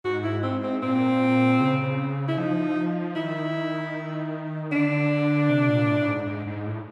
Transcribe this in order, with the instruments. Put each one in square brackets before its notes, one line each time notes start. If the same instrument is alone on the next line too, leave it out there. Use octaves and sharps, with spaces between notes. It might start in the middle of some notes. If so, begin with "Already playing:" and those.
[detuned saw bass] G#2 [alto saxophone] F#4
[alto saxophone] E4
C4
C4
[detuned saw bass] A#2 [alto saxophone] C4
[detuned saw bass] C#3
[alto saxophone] E4
[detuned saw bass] F3 [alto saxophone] D#4
[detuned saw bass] D#3 [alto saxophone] E4
[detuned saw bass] D3 [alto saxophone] D4
[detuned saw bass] C3
A#2
A2
G#2
G#2
G#2
A2